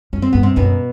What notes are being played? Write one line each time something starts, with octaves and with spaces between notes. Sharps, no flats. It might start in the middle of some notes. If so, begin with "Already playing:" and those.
F#2 C#4
C4
G2 B3
C3 C4
F#2 B2 B3